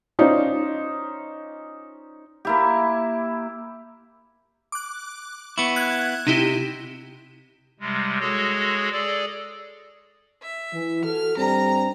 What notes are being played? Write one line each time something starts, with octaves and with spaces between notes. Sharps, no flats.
C#4 D#4 F4 C5 D5 D#5
A#3 E4 G4
D6 F#6
B3 E4 C#6
F#6 G#6
C3 D#4 E4 G4
C3 G3 G#3
G#3 F#4 G#4 A4 C#5
G#4 A4 D5
E5
E3
F#4 A4 F6
G2 G3 C4 A#5